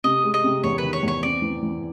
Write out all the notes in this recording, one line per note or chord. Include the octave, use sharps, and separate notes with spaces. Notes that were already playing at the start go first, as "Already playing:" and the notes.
C3 D#5
G#3
D#5
C3
E2 C#5
D#3 B4
C#5
E2 C#5
C4 D5
E3
E3